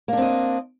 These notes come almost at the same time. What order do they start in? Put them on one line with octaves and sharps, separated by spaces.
A#3 D4 C4 D#5